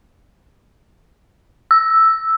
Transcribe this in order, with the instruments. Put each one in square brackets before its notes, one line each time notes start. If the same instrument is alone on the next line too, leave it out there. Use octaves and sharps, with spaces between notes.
[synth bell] E6